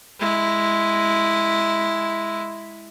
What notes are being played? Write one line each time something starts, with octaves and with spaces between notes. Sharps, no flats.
G#3 E4